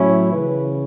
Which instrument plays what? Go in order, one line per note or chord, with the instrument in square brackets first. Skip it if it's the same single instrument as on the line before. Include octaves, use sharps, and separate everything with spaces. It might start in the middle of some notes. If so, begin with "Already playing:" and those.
Already playing: [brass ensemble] A2 F#3 C#4 E4 C#5
C#3 E3 C#4 B4